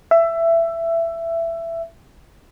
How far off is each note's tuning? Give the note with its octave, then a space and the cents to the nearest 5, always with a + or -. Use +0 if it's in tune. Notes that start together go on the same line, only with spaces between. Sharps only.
E5 +15